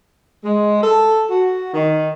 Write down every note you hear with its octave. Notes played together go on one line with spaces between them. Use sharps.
G#3
A4
F#4
D#3